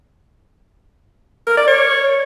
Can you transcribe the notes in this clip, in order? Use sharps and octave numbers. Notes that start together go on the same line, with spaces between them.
A#4
D5
C#5